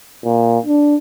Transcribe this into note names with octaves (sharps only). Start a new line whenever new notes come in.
A#2
D4